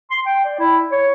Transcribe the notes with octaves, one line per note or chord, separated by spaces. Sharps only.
C6
G5
D5
E4
C#5